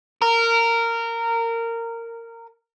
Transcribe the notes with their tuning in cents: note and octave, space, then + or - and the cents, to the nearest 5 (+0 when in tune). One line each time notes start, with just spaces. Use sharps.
A#4 -15